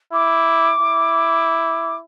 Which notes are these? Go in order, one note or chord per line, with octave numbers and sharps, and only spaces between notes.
E4 D6
E4